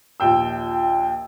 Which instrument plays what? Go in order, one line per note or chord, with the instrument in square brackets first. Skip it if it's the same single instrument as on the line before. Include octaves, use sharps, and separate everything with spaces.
[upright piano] A#1 D#2 G5 E6